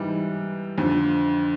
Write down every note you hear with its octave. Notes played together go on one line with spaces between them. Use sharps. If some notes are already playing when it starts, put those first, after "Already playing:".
Already playing: G#2 E3 G3
F2 D3 F3